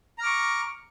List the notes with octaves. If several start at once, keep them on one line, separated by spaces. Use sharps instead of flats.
A#5 C#6 D6 F6